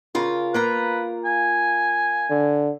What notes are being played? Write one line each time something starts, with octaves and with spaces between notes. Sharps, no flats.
C#3 F4 A#4
A#3 F4 B4 A#5
G#5
D3